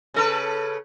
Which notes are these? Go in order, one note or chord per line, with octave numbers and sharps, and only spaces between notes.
C#3 A4 B4